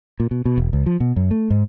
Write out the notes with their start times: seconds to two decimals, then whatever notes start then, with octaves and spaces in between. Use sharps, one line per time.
0.20 A#2
0.31 B2
0.45 B2
0.58 E1
0.73 C#2
0.86 F3
1.00 B2
1.16 F#2
1.31 A3
1.50 G#2